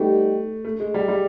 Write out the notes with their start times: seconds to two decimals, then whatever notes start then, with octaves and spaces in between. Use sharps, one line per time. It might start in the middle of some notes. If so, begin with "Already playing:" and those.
Already playing: G3 A3 B3 D#4 G4
0.65 A3
0.80 G#3
0.94 G3
1.08 G3